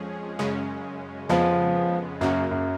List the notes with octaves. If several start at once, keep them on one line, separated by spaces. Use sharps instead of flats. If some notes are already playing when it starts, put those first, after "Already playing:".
Already playing: F2 F3 G#3 C#4 G#4
F#2 C#3 G#3 C#4
F2 C#3 F3 G#3 B3
F#2 C#3 F#3 A#3
F#2